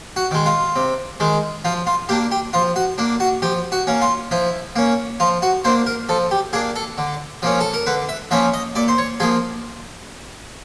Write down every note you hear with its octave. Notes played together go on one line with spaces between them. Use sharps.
F#4
D#3 G#3
F4
C3
D#3 G#3
F3 F4
F4
A#3 D4 G4
G4
F3 F4
F#4
A#3 D4
F#4
F3 G4
F#4
A#3 C#4
F4
F3 E4
A#3 C#4
F3 F4
F#4
A#3 D4 C5
A#4
F3 A4
G4
A#3 D4 G#4
A4
D3
F3 A#3 C#4
A4
A#4
D3 B4
E5
F3 A#3 C#4 E5
D#5
A#2 D5
C5
C#5
F3 A#3 G#4